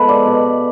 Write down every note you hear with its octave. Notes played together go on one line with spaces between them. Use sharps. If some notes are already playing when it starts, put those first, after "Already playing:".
Already playing: F3 G#3 B3 A4 B4
D5
B2